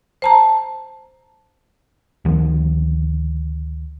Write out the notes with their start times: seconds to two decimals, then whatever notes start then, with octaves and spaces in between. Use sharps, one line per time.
0.22 C5 A5 A#5
2.25 D2 D#3 F3